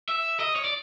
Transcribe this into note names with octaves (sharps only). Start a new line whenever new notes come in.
E5
D#5
C#5
D5